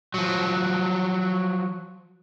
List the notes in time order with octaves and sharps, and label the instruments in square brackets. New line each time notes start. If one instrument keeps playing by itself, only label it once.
[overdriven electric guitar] F3 F#3